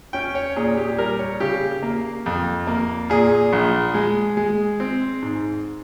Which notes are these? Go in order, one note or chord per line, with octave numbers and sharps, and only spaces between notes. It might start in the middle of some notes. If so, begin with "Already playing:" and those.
C#4 G5
C#5
A#2 G#4
G4
G3 A#4
C#5
C#3 G4
A#3
F2
A#3
A#2 G#4
A#1
G#3
G#3
C4
G#2